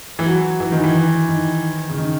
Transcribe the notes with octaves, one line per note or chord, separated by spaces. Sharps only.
E3
F#3
E3
D#3
E3
D#3
C#3
D#3